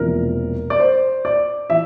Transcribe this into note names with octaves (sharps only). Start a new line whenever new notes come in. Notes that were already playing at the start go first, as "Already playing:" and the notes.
Already playing: E1 E2 C3 F3 A#3 A#4
D5
C5
D5
E3 E5